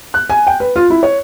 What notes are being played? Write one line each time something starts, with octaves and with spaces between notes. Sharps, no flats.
F#6
G#5
G5
B4
F4
E4
C#5